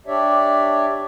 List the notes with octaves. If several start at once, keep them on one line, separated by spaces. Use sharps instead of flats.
D4 G4 C#5 D5 E5